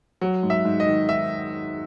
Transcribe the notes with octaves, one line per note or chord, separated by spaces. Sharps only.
F#3
G#2
E5
G#2
D#5
D#3
D#3 E5